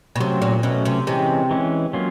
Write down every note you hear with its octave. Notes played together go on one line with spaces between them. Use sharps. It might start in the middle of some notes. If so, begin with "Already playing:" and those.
B2
C3 F#3 A3 C#4
A#2
B2 F#3 A3 C#4
C3
C3 E3 G#3 C#4
E3 G#3 C#4
F#3 A#3 C#4 F4